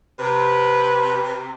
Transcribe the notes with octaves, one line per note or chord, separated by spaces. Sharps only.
C3 B4